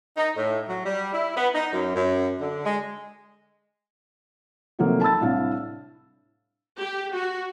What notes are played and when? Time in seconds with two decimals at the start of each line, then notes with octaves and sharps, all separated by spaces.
0.17 D#4
0.37 A2
0.69 F#3
0.86 G3
1.14 E4
1.36 B3
1.55 D#4
1.73 F#2
1.96 F#2
2.40 D3
2.65 G#3
4.79 C3 D#3 F3 F#3 A3 A#3
5.01 A5 B5 E6 A6
5.21 C2 A2 D4 F5
6.78 G4
7.14 F#4